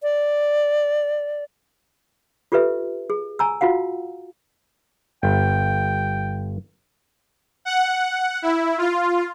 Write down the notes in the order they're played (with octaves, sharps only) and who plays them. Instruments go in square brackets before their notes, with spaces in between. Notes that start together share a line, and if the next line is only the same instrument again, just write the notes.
[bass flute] D5
[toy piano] F4 G4 A4 B4 E5
G#4
G#5 A#5 E6
F4 F#4 F5 F#5
[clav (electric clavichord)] G1 [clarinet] G5
[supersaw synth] F#5
E4
F4